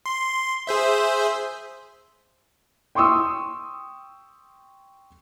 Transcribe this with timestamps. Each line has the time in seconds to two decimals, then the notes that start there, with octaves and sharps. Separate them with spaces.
0.06 C6
0.67 G#4 C5 E5
2.95 G5 C6 C#6 D#6 E6